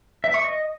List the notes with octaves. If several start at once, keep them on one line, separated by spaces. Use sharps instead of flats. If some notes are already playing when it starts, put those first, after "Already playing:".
E5
C#6
D#5